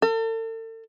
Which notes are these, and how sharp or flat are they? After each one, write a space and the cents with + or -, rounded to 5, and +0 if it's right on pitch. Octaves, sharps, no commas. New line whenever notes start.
A4 +40